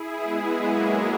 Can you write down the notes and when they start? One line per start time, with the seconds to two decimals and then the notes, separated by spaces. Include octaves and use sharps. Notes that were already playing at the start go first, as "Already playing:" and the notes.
Already playing: E4 G#4
0.14 G#3 B3
0.56 F#3 A#3